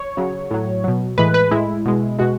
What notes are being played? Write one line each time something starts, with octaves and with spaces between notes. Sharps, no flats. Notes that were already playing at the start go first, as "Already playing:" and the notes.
Already playing: C#5
C#3 F#3
A2 F#3
B2 F#3
A2 E3 G#3 B4
B4
A2 G#3 E4
B2 G#3
B2 G#3 F#4